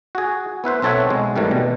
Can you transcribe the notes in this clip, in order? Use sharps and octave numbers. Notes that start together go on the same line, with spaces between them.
F#4 G#4
B3 E4 B4 C5
B1 C4 A4 C#5 E5 F#5
B1 G#3
G#2 C3 D#3 E3 G3 A3
B2